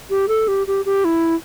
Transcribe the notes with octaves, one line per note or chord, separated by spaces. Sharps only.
G4
A4
G4
G4
G4
E4